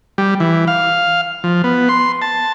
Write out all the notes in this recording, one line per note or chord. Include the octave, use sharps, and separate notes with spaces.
G3
E3
F5
F3
B3
C6
A5